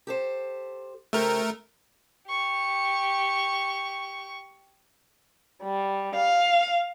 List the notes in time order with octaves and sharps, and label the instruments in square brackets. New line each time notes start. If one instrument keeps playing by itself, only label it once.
[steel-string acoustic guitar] G4 A4 C5
[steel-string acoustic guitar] C#3 G4 C5 [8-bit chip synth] A3 A#4
[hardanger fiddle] G4 C#6
[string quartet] G3
F5